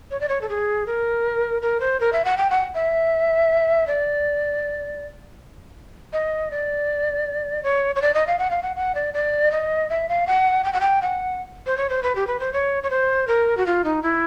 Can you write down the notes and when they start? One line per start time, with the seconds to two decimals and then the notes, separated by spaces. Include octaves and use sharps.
0.11 C#5
0.20 D5
0.28 C#5
0.41 A4
0.49 G#4
0.86 A#4
1.62 A#4
1.80 C5
2.00 A#4
2.13 E5
2.25 F#5
2.37 G5
2.50 F#5
2.74 E5
3.87 D5
6.13 D#5
6.51 D5
7.63 C#5
7.95 C#5
8.02 D5
8.14 D#5
8.27 F5
8.39 F#5
8.50 F5
8.63 F#5
8.76 F#5
8.95 D5
9.14 D5
9.51 D#5
9.90 E5
10.09 F5
10.27 F#5
10.64 G5
10.73 F#5
10.81 G5
11.02 F#5
11.66 C5
11.77 C#5
11.89 C5
12.03 B4
12.15 G4
12.27 B4
12.40 C5
12.53 C#5
12.83 C#5
12.90 C5
13.27 A#4
13.57 F#4
13.66 F4
13.84 D#4
14.03 E4